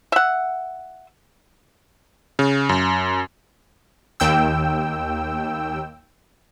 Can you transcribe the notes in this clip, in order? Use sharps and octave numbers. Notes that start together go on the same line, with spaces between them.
E5 F#5
C#3
F#2
D#2 G5 E6